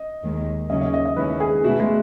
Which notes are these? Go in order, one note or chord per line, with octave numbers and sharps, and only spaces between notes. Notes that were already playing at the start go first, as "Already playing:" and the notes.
Already playing: D#5
D#2 D#3 G#3
D#2 C#3 F#3 C#4 D#5
D#5
D#5
D#5
D#2 D#3 G#3 C#4 E4 B4
G#4
B2 A3 E4 F#4
G#3